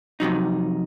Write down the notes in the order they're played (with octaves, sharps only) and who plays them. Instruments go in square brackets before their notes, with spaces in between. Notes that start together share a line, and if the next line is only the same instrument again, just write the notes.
[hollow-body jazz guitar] F2 C3 F#3 D#4